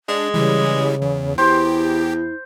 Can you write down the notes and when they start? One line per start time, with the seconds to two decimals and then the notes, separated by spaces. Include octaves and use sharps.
0.08 G#3 D4
0.34 C#3 E3 G3
1.02 E2
1.38 E2 E4 G4 C5